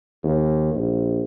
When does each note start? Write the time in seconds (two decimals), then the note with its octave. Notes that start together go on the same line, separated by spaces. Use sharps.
0.24 D#2
0.75 A#1